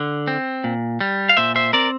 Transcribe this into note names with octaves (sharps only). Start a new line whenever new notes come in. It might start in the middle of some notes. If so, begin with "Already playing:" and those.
Already playing: D3
C4
A#2
G3
F5
A#2 C5 E5
C5 E5
C4 A#4 D5